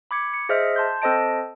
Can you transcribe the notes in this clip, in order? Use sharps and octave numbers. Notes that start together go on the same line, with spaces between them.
B5 D6 G#6 C#7
C#7
G#4 C5 D#5 E5 F6
A5 C6 G6
C4 A4 C5 D#5 A5 D7